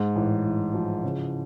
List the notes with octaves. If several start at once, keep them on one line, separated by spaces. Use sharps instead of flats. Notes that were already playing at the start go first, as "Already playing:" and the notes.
Already playing: G#2
A1
A1
F3
C#3